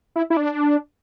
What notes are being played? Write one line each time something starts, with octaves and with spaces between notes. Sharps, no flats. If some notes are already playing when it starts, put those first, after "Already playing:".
E4
E4
D4